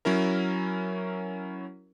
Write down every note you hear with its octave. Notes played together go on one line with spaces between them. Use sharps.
F#3 C#4 E4 A#4